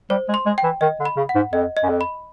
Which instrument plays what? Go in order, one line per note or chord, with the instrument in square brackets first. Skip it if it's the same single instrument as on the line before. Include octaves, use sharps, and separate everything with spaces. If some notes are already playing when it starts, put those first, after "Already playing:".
[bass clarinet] G3 [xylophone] C5
[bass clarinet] G#3
[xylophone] C6
[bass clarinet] G#3
[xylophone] G5
[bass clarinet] E3
[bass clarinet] D#3 [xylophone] D#5
[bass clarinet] D3
[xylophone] B5
[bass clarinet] C#3
[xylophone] F#5
[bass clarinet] G#2
[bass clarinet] F2 [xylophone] D#5
[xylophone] D#5
[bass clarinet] F#2
F2
[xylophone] B5